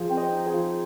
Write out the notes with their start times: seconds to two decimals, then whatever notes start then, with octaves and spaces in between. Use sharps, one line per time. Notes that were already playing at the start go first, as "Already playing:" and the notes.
Already playing: F3 G#4
0.09 C4
0.17 C5 D#5
0.32 D#4
0.46 G#4 C5
0.54 F3